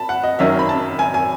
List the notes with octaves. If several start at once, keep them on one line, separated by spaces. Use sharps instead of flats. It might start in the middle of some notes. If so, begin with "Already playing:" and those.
Already playing: A5 B5
F#5
D#5
F#2 D#3 F#3 C#4 E5
B5
A5
G#5
G#5